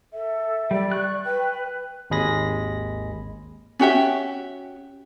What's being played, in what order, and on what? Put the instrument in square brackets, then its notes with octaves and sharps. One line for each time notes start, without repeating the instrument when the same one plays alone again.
[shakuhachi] A4 [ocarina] E5
[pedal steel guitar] G3 [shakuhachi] D5
[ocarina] C#6 [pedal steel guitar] F#6
[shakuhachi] B4 [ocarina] G5
[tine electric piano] G#1 D#2 G#3 G#4 B5 A#6
[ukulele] C#4 F#4 G4 E5